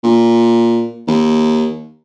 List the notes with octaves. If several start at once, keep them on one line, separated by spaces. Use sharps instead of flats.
A#2
D#2